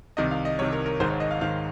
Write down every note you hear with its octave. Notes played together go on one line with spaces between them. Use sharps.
C2 C3 D#3 D#5
F5
D#5
C2 C3 D#3 C#5
A#4
A#4
G#1 G#2 D#3 C5
C#5
D#5
F5
G#1 G#2 D#3 F5